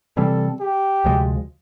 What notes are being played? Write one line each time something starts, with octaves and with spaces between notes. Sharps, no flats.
C3 E3 G3 C4 A4
G4
D2 C3 F3 G#3